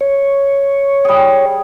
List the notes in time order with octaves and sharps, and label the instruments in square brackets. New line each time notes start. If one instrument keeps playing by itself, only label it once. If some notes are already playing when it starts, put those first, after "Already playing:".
[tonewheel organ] C#5
[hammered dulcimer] G3 G#4